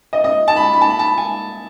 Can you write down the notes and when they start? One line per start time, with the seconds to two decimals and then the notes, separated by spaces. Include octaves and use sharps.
0.13 D#5
0.24 D#5
0.48 A5
0.56 B5
0.64 A5
0.73 B5
0.81 A5
0.90 B5
0.99 A5
1.18 G#5